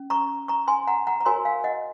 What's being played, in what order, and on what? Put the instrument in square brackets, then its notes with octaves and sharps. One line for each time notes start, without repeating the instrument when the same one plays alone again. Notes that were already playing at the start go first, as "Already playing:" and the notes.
Already playing: [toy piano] C#4
A#5 C#6
A#5 C#6
G#5 C6
F#5 A#5
F#5 A#5
A#5
F#4 A#4 C#5 G#5 C6
F5 G#5
D#5 F#5